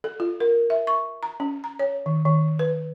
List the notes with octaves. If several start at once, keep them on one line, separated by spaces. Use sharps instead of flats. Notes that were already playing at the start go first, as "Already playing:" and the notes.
A4
F4
A#4
E5
C#6
A#5
C#4
A#5
C#5
D#3
D#3
B4